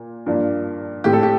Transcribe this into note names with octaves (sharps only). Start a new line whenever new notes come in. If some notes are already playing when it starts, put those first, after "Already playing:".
Already playing: A#2
G2 F3 A#3 D4
A2 A3 C4 G4
A4
G4